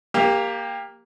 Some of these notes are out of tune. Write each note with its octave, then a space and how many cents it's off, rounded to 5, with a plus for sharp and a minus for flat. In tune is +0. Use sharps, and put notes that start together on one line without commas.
A#3 +0 G4 +20